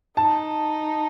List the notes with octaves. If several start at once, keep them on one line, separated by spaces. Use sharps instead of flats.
D#4 A5